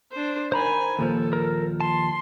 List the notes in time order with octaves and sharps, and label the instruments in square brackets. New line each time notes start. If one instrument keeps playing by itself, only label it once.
[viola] D4 C5
[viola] D#3 G#5 [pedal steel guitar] C5 A#5 B5
[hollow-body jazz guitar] D#2 A#2 F3 [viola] A4
[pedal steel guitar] A#4
[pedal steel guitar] A5 [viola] C6